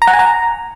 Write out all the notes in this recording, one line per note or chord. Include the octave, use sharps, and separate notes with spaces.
A#5
F#5
G#5
A#5